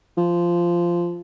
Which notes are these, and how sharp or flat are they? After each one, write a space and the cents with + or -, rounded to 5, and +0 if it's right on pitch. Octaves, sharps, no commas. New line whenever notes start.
F3 -10